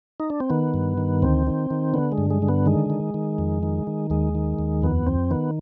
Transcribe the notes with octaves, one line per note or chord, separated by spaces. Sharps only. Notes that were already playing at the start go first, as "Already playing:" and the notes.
D#4
D4
C4
D#3 B3
G2
D#3
D2 C4
D#3
D#3
D3 B3
G#3
G2
G#3
D3
B3
D#3 G#3
D#3
D#3
F2
D#3
D#3
D#2 G#3
D#3
D#2
F2 B3
F2 C4
D#3 B3